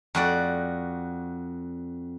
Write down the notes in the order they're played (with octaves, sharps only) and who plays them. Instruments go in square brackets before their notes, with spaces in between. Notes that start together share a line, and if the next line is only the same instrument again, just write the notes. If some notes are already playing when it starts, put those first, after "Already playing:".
[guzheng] F2 F#4 D5